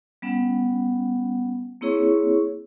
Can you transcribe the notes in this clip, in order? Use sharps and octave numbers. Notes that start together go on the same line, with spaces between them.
G3 B3 C#4 F#5
A#3 C4 E4 G#4 C#5 C#6